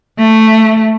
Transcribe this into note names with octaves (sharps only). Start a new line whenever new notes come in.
A3